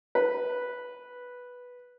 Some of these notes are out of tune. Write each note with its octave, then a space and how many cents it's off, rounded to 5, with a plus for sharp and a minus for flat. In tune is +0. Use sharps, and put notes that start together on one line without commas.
B4 -5